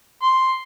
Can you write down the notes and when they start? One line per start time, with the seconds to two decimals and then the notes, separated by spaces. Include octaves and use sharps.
0.23 C6